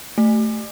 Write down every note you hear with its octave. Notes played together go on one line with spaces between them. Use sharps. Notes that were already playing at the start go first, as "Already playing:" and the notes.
A3